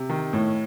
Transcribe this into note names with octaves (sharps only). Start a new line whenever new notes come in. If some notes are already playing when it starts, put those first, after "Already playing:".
Already playing: C3
D#3
A2